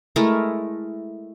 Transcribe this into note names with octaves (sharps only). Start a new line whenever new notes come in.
G#3 A3 E4 A#4